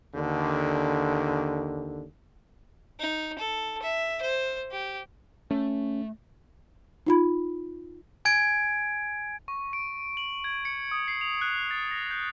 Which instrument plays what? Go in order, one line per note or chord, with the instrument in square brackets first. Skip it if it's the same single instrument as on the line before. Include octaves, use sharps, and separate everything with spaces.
[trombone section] D#2 D3
[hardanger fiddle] D#4
A4
E5
C5
G4
[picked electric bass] A3 [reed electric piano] C#4
[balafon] D#4 F4 B5
[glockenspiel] G#5 G#6 D7
[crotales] C#6
D7
F#7
G#6
C#7
D#6
C7
F7
F#6
A6
A#6
G6